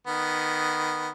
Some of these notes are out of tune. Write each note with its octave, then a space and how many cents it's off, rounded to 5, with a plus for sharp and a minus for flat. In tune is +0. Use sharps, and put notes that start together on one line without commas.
D#3 -5 B3 +0